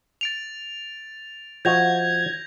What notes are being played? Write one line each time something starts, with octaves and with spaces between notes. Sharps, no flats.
A6 D7 F7
F3 F#4 D#5 G6 G#6 A#6 F7